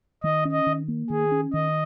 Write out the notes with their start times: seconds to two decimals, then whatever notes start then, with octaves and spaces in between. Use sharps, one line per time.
0.23 D#3 D#5
0.45 C#4
0.52 D#5
0.66 D#3
0.88 A#3
1.10 D#3 G#4
1.31 C#4
1.53 D#3 D#5